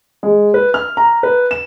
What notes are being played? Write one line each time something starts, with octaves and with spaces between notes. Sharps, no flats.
G#3
B4
F6
A#5
B4
E7